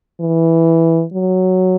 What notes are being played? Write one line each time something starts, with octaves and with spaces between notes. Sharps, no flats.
E3
F#3